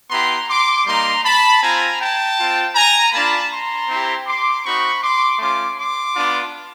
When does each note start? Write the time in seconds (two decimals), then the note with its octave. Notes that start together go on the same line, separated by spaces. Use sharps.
0.10 B3 E4 G4 A#5 C6
0.48 C6 D6
0.86 G3 A#3 D#4 A#5 C6
1.23 A5 B5
1.61 C4 F4 G#5 A#5
1.99 G5 A5
2.37 C4 F4
2.75 G#5 A#5
3.12 A#3 D4 F4 A5 B5
3.50 A#5 C6
3.88 C4 E4 G4
4.26 C6 D6
4.64 C4 D#4 F#4 B5 C#6
5.01 C6 D6
5.39 A3 C#4 F4 C6 D6
5.77 C6 D6
6.15 B3 D4 F4